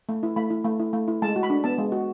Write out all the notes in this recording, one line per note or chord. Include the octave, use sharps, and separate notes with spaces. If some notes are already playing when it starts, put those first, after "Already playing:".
A3
E4
A3 B5
E4
A3
E4
A3
E4
G#3 A5
F#4
B5
D4
B3 A5
G#3
F#4